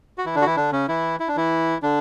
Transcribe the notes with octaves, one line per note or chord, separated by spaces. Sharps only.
F#4
E3 E4
D3 D4
F#4
E3 E4
D3 D4
C#3 C#4
E3 E4
E4
D4
E3 E4
D3 D4